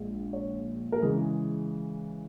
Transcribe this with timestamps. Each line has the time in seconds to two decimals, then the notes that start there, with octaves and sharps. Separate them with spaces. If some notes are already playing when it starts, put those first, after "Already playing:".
Already playing: A#1 A#2 G#3
0.33 C#5
0.92 A#4
1.02 C#3 E3 G#3 G#4